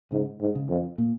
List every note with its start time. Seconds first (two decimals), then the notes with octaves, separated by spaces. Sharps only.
0.12 G#2 C#3
0.40 G#2
0.55 C#3
0.69 F2
0.98 A#2